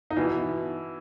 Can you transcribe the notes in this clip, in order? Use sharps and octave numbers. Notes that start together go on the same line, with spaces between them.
D#4
B2 E3 E4